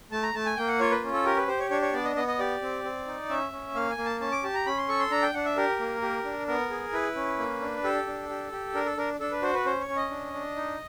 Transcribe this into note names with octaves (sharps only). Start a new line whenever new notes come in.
A3 A5
A#5
A3 A5
G#5
A#3 G5
F#5
F4 C#5
B4
C#4
A4
G4 A#4
B4
G4 C5
C#5
D4 C#5
C#5
B3 D5
D#5
B3 D#5
D#5
G4 D5
C4
C4
D#4
C#4 E5
C#4
A#3 F5
G#5
A#3
A5
C#4 A5
D6
G4 A5
A#5
C#4 B5
C6
A4 C#6
C6
D4 A#5
G5
D4 F#5
E5
G4 A#4
A#3
G4
D4
B3 A#4
G#4
E4 B4
C#4
A#3
D4
G4 A4
D4
G4
G4
D4 A#4
A4
D4 A#4
D4 A4
B4
F#4 C5
B4
C#4 C5
C#5
C#4
D#5
D4
D4
D#4